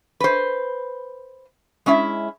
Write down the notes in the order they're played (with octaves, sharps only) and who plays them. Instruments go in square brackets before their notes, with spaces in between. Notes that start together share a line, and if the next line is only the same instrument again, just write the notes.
[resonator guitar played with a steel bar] B4 C5
G#3 C#4 E4 E5